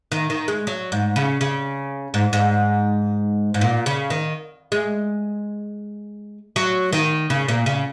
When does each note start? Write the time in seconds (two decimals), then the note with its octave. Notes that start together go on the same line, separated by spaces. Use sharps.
0.12 D#3
0.30 D#3
0.48 G#3
0.67 F#3
0.92 G#2
1.16 C#3
1.41 C#3
2.14 G#2
2.33 G#2
3.54 G#2
3.61 A#2
3.86 C#3
4.10 D#3
4.72 G#3
6.56 F#3
6.93 D#3
7.30 C#3
7.48 A#2
7.66 C#3